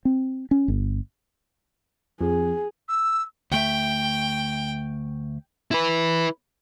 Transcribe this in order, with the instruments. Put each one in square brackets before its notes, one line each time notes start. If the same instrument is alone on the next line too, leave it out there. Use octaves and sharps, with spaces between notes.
[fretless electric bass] C4
C#4
G1
[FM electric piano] F2 [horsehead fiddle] G#4
[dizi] E6
[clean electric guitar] D2 A3 E5 [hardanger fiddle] G5
[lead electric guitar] E4 B4